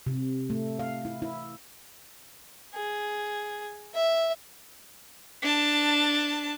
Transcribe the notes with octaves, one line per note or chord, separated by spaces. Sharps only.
C3
A3
F5
E4
E4
G#4
E5
D4 A5